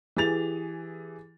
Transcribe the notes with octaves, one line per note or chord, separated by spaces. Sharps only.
E3 G4 G#4 A6 F7